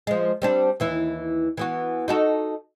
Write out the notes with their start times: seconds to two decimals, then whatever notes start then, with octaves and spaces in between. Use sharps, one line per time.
0.07 F3 G#3
0.42 G3 C4 D4
0.80 D#2 E3 E4
1.57 E3 B3 F#4
2.08 D#4 F#4 A4